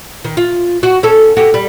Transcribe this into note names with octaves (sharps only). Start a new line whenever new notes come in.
D#3
F4
F#4
C#4 A4
F#4 G4
G3